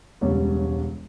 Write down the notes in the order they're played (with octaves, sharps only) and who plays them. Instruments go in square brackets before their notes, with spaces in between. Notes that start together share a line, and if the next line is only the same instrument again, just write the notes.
[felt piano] E1 C#2 G3 C#5